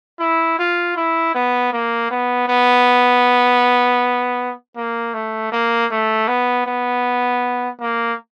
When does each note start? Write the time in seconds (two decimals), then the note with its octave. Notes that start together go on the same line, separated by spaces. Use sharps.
0.19 E4
0.58 F4
0.96 E4
1.34 B3
1.73 A#3
2.10 B3
2.48 B3
4.77 A#3
5.14 A3
5.52 A#3
5.91 A3
6.28 B3
6.66 B3
7.81 A#3